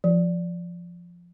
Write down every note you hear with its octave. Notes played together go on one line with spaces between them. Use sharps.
F3